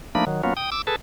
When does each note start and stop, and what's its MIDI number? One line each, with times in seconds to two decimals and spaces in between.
0.15 0.25 53
0.15 0.25 57
0.15 0.25 58
0.15 0.25 62
0.15 0.25 63
0.15 0.25 83
0.27 0.42 51
0.27 0.42 54
0.43 0.54 54
0.43 0.54 58
0.43 0.54 59
0.43 0.54 61
0.43 0.54 65
0.57 0.70 79
0.57 0.70 87
0.72 0.82 86
0.72 0.82 88
0.87 0.96 68
0.87 0.96 69
0.87 0.96 71
0.87 0.96 81